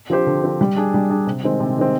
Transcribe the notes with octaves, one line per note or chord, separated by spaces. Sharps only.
F3 C4 G4 C5
D3
F3 C4 G4 C5
G3
D4 G#4
G3
D4 G#4
C3
D#3 G#3 C4
C3
D#3 G#3 C4